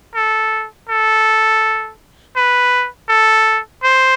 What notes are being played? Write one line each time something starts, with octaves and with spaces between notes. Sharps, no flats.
A4
A4
B4
A4
C5